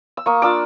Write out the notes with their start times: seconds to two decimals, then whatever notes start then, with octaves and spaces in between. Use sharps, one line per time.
0.17 E6
0.26 A#3 C#6 D#6
0.42 D4 F4 D6 E6